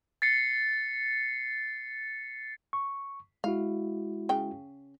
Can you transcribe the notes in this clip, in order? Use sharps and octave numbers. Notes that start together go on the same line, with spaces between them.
A6 C7 C#7
C#6
G#3 E4 F#4 F5
C#3 G5